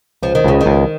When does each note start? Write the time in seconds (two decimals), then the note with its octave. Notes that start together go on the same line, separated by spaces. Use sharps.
0.23 C#2 F3
0.35 D#3
0.44 C#2 C#3
0.61 D#3
0.66 C#2